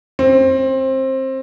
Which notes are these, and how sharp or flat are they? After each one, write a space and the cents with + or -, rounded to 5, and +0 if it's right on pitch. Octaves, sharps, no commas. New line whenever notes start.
C4 +20